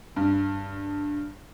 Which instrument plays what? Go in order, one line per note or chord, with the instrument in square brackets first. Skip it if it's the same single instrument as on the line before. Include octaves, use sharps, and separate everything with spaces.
[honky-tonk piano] G2